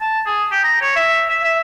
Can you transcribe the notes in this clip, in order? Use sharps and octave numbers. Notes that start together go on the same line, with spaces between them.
A5
G#4
G4
A#5
C#5
E5
E5
E5